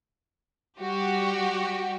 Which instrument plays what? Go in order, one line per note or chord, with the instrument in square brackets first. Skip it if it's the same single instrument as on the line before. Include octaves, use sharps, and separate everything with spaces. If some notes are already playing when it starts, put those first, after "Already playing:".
[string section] G3 F#4 G4